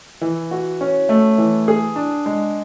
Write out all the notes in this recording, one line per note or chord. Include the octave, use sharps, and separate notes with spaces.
E3
F#4
C#4
A3
E3
G#4
D4
G#3